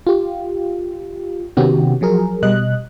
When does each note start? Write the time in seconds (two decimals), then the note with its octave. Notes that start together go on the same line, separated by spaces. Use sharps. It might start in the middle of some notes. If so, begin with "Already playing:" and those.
0.07 F4 G4
1.57 C3 D#3 B3 C#4 F#4 G4
2.01 F3 F#3 G#4 A#4
2.43 B2 G3 D#5 F#6